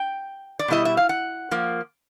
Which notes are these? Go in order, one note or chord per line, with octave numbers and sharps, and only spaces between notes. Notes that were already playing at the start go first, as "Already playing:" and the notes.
Already playing: G5
D5
B2 G3 C4 E4 D#5
E5
F5
F#5
F3 A#3